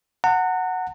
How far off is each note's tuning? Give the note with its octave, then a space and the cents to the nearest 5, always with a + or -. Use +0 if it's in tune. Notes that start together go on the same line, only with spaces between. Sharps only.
F#5 +0 A#5 -40